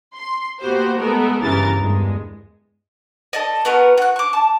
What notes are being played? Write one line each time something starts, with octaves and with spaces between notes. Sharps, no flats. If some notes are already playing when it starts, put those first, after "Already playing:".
C6
A#3 B3 F#4 G4 C5
G#3 A3 B3 A4 A#4
G1 C#3 E3 G4 A#4 A6
E2 G2 G#3
A4 D5 D#5
B3 F#4 A#4 B4
F#4 F#6
C#6 D6
A5